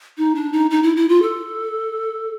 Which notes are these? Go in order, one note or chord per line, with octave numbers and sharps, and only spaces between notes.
D#4
D4
D#4
D#4
E4
E4
F4
A4